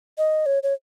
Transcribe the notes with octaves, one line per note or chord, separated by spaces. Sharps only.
D#5
C#5
C#5